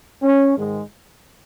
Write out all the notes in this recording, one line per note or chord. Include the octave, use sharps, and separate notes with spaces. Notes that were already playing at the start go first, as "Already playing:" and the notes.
C#4
G#2 D#3 G#3